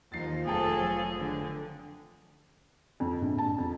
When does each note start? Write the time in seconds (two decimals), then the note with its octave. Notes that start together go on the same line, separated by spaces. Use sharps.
0.12 D#2 F3 D#4 A6 C7
0.46 F1 F#3 G#4 A4 G5 A5
1.17 D3
3.00 F2
3.22 A#1
3.38 A5
3.58 F2